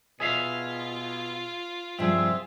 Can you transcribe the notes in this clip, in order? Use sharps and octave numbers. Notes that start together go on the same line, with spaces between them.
B2 F4 G#4 E5 F5
G2 C3 F3 C4 G#4 E5